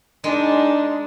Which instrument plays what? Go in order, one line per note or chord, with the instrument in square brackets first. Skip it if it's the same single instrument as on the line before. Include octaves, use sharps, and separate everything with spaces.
[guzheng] G#3 [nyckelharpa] D4 D#4